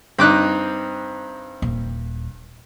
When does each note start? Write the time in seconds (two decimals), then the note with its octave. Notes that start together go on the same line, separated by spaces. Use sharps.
0.19 G2 C4 D#4 D6 F#6
1.62 D#1